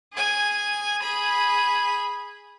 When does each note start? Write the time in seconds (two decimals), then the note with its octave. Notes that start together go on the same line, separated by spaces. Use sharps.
0.14 G#4 G#5
1.02 G#4 B5